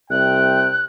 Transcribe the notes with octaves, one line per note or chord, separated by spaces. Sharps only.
C2 C3 G5 F#6